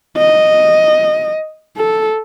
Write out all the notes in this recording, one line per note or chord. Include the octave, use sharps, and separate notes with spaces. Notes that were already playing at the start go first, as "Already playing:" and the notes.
D#5
A4